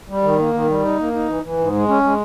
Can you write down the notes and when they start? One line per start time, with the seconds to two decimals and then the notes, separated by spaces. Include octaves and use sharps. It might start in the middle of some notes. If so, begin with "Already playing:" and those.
0.09 G3
0.23 D#3
0.39 A#3
0.54 D#3
0.69 G3
0.83 D#4
0.99 A#3
1.13 D#4
1.28 E3
1.43 E3
1.59 G#2
1.73 G#3
1.88 C#4
2.03 G#3